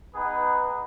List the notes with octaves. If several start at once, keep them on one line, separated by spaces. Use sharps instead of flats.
B3 D#4 G#4 B4